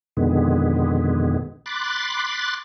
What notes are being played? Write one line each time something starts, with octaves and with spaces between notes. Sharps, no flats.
F2 B2 D3 D#3 G#3 B3
B5 C6 D6 F#6 A6